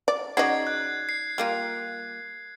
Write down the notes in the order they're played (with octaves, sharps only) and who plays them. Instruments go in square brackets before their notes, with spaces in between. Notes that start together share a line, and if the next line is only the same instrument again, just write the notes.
[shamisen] D5
[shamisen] C#3 D#5 [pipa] D#4 F#4 D5 [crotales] G#6 C7
[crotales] F#6
C7
[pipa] G3 A#3 F4